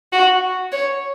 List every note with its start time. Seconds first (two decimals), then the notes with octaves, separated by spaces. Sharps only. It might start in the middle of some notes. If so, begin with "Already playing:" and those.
0.13 F#4
0.72 C#5